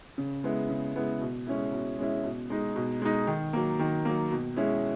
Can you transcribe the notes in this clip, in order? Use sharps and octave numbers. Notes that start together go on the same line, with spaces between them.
C#3
G#3 B3 E4
C#3
G#3 B3 E4
B2
G#3 C#4 E4
B2
G#3 C#4 E4
B2
G#3 D#4
B2
G#3 D#4
D#3
F#3 A#3
D#3
F#3 A#3
B2
G#3 C#4 E4